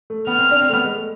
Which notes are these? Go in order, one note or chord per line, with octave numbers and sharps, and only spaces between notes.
A3
B3 F6
C4
D4
C4
A3
B3
G#3
A3